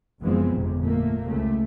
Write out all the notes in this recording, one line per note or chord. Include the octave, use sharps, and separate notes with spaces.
F#1 E3 F3 G#3 B3 C4
G1 F2 C3
A#2 A3 A#3
C#2 C3 A3